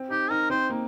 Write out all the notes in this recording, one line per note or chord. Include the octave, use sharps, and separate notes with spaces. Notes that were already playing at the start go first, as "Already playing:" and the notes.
Already playing: C4
D#4 G4
D#4 A#4
C4 C5
A#3